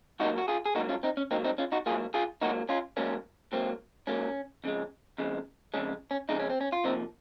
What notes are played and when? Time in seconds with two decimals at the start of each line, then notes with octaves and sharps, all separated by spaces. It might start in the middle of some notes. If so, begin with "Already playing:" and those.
0.20 G#2 F#3 A#3 D#4 F#4
0.38 F#4
0.48 F4 G#4
0.66 G#4
0.75 G#2 F#3 A#3 D#4 F#4
0.89 C#4 F4
1.03 C4 D#4
1.17 C#4
1.31 G#2 F#3 A#3 C4 D#4
1.45 C4 D#4
1.58 C#4 F4
1.72 D#4 F#4
1.86 G#2 F#3 A#3 F4 G#4
2.14 F4 G#4
2.42 G#2 F#3 A#3 D#4 F#4
2.69 C#4 F4
2.97 G#2 F#3 A#3 C#4
3.53 G#2 F#3 A#3 C4
4.07 G#2 F#3 A#3 C#4
4.64 F2 C#3 G#3
5.18 F2 C#3 G#3
5.74 F2 C#3 G#3 C#4
6.11 C#4
6.29 F2 C#3 G#3 D#4
6.40 C#4
6.50 C4
6.61 C#4
6.72 F4
6.84 C3 F3 A#3 C4 D#4